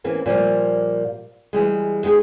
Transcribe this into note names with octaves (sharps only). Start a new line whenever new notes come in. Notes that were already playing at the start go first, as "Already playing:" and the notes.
E3 A#3 C4 C#4
A#2 F3 G3 A#3
E3 G3 G#3
G#3 D#4 G4 G#4